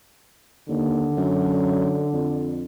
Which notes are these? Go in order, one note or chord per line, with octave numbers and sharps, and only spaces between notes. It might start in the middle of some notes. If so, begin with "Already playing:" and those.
D#2 D3
F#2
F2